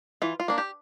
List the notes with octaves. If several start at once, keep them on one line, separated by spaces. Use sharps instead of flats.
E3 F4
F4
A#3 D4
G4